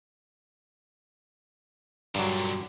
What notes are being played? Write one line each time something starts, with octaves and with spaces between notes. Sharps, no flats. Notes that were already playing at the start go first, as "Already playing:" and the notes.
G2 A#2 D3 F#3